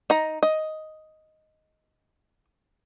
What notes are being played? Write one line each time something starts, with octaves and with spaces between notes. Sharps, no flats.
D#4 A#5
D#5